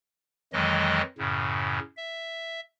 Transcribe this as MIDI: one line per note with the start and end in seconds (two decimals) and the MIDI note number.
0.53 1.02 41
0.53 1.02 51
0.53 1.02 52
0.53 1.02 54
0.53 1.02 56
0.53 1.02 75
1.18 1.79 42
1.18 1.79 45
1.18 1.79 49
1.97 2.60 76